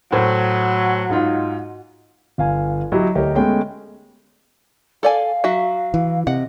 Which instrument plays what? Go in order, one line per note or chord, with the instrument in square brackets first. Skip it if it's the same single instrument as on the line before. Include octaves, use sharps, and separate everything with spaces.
[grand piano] A2 C5 [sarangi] F#3
[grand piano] G#2 D#4 F4
G1 F5 G#5
F#3 E4 G4 D#5
D2 G4 A#4 C#5 D#5
G#3 A3 B3 C#4 G5
[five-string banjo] A4 D5 G#5 [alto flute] F5
[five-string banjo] F#3 F#4 E5
[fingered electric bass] E3
[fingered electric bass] C3 [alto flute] D#5 [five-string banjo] F#5